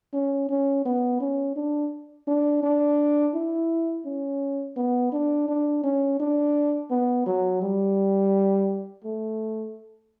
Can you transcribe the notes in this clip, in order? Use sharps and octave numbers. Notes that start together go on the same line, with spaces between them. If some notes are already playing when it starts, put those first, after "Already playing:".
C#4
C#4
B3
C#4
D4
D4
D4
E4
C#4
B3
D4
D4
C#4
D4
B3
F#3
G3
A3